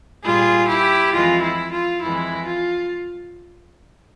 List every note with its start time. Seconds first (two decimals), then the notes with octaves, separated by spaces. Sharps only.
0.24 A#2 G3 F4 G#4
0.68 E4 G4
1.13 F2 E3 G#3 F4
1.42 E4
1.72 F4
2.02 F2 E3 G#3 E4
2.46 F4